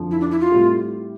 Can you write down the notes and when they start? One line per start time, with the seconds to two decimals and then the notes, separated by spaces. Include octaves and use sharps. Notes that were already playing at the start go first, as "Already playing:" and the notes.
Already playing: F2 D3 F3
0.11 E4
0.20 D4
0.31 E4
0.40 F4
0.52 A2 G3 C4 E4 G4